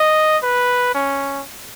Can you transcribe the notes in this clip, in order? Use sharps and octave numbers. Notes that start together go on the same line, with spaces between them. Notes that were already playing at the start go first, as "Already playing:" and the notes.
Already playing: D#5
B4
C#4